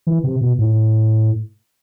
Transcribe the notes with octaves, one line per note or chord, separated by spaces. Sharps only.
E3
C3
B2
A2